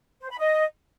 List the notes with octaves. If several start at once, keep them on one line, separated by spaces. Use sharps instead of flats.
C5
B5
D#5